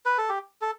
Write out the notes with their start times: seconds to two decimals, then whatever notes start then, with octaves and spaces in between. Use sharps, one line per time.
0.06 B4
0.18 A4
0.29 G4
0.61 A4